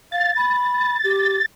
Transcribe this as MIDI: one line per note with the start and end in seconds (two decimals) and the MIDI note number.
0.12 0.32 77
0.12 1.46 93
0.37 0.97 83
1.04 1.37 67